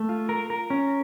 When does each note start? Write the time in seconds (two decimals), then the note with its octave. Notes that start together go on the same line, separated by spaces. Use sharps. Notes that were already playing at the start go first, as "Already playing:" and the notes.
Already playing: A3
0.09 F4
0.29 A#4
0.50 A#4
0.70 C#4